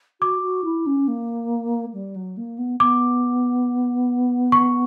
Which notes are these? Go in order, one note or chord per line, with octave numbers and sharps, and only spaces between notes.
F#4 D6
F#4
E4
C#4
A#3
G3
F#3
A#3
B3
B3 D6
C#6